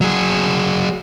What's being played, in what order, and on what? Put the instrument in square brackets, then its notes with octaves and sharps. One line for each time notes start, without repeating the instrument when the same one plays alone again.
[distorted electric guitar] F#3 G#4